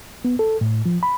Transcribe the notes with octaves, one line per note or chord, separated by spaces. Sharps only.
B3
A4
A2
F3
B5